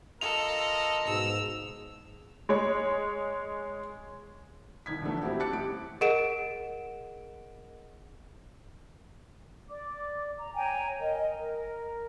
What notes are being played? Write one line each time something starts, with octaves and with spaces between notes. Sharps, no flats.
F4 A4 A#4 D#5 F7
G#2 B2 E6
G#3 C#5
C2 D#3 G#6 B6
A#1 E2 D3 D#3 A3
G3 C4 E4 F#4 G4
A5 D6 F#6 A6 C#7
A1 G4 D7
G#4 A#4 D#5 F#5 D7 E7
D5 D6
A#5
C#5 G5 G#5 A#5
A#4 D#5
A#4